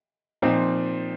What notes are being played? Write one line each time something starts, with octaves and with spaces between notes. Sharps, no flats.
A#2 F3 C4 D#4